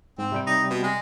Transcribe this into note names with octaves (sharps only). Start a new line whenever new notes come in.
G#2 C4
C3 G3 G5
D#4
B2
G#3